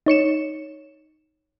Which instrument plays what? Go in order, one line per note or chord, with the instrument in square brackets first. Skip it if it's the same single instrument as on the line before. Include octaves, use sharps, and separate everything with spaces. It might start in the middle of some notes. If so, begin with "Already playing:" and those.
[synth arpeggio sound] D#4 C#5 C#7 E7